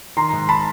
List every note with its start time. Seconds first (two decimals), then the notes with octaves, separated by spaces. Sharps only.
0.17 D#3 A#5 C6
0.33 G#2
0.49 A5 B5